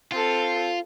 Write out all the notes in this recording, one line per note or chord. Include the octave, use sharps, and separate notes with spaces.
C4 F4 A4